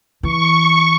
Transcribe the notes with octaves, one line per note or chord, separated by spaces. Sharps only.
E3 C#6